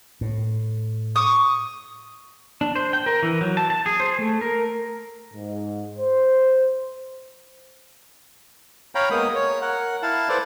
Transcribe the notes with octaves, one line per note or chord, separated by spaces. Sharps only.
A2
C#6 D#6
D4
C5
G5
A#4
E3
F#3
A5
A5
G#4
C5
A3
A#4
G#2
C5
C#5 F5 G5 A#5 B5
G#3 A#3 B3 A#4 D#6
C#5
A#4 F#5
E4 F5 A5
A4 B4 C5 D5